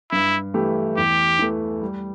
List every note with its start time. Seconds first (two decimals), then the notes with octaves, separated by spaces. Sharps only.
0.12 G2 E4
0.54 E3 A3 E4 G4
0.97 E2 G4
1.39 E3 A3
1.81 G3